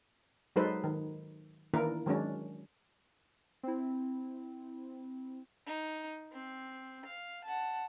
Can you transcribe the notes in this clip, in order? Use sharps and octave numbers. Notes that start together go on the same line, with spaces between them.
F#3 G#3 D#4 A4 B4 C5
D#3
D#3 E3 A#3 D4 E4 A#4
D#3 F#3 G#3 C#4 D4
C4 E4
D#4
C4
F5
F#5 A5